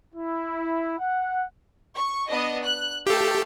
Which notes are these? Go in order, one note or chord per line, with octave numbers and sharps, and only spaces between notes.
E4
F#5
C#6
B3 D4 D#5
F#6
A3 G4 A4 F5